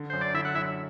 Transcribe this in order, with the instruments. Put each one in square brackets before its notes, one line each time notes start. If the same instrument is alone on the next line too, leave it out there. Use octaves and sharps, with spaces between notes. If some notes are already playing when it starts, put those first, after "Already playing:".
Already playing: [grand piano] D3
[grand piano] F#2 [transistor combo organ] C5
[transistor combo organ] D5
[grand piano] D3 [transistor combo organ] E4 E5
[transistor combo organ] F#5
[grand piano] F#2 [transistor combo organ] E4 E5